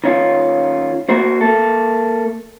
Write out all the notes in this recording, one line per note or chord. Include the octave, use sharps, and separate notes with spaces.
D#3 C#4 F4
A#3 F#4 C5
A#3 A4